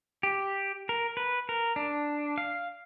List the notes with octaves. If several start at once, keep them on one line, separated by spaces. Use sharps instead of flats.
G4
A#4
B4
A#4
D4
F5